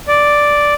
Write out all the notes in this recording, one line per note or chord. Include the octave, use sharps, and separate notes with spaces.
D5